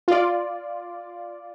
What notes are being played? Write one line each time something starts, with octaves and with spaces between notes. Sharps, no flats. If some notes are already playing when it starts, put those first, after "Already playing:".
F4 D5